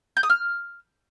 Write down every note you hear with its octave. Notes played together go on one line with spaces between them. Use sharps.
G6
D#6
F6